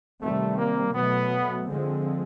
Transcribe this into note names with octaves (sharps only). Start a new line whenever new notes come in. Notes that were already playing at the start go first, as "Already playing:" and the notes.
C3 D#3 G3 A3 C4
A#3
B2 F#3 A3 B3
D3 F3 G#3 C4